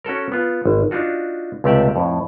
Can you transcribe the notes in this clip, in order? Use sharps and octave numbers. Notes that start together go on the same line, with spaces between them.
C#4 F#4 A4 A#4
B3 F4
G#1
D4 D#4 F4 F#4
C#2 C3 A3 G4 D5 E5
F2 A2